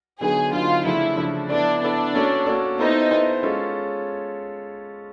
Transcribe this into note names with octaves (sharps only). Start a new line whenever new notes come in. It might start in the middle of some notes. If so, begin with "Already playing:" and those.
D3 F#3 B3 D#4 G#4
D3 F#3 B3 D#4 F4
C#3 F3 A3 D4 E4
C#3 F3 A3 D4
B3 D4 E4 A4 D5
B3 D4 E4 A4 D5
A#3 C#4 F#4 A4 D5
A#3 C#4 F#4 A4 D5
B3 D#4 E4 A4 C5 D#5
B3 E4 A4 C5 D#5
G#3 C#4 F4 A4 C#5